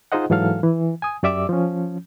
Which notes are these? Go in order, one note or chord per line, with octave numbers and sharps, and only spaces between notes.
D#4 F4 G#4 C5 D#5 F#5
G#2 E3 F#3 A4 F5 F6
E3
G#5 D#6
F#2 G4 D5 E5 D6 E6
F3 C#4